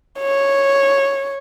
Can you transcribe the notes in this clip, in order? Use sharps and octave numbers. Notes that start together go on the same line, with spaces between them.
C#5